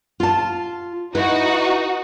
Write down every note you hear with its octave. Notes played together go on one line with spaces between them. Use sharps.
F4 A5
D#4 E4 F#4 B4